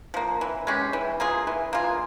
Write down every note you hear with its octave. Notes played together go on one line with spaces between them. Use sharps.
F3 A#3
E3
G#3 C#4 G4
E3
A#3 F4 G#4
E3
A#3 F4 G#4